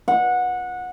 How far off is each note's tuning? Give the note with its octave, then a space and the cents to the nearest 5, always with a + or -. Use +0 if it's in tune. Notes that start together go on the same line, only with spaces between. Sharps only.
F#5 -20